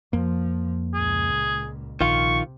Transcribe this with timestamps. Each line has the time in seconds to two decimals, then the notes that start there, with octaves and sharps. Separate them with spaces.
0.13 F2 F3 A#3
0.94 C#2 A#2 G#4
2.01 A#1 C3 D#3 F4 C#6